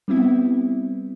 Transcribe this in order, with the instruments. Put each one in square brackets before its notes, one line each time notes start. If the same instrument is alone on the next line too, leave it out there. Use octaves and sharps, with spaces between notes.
[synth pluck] G3 B3 C4 E4